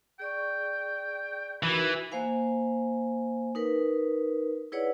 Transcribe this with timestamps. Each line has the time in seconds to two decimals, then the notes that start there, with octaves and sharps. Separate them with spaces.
0.20 G#4 D5 G5 C#6
1.63 E3 D#4 F#4 A#4 B5
2.12 A#3 C5 F5 G#5
3.55 D#4 A#4 B4
4.72 E4 G#4 B4 C#5 D5 F#5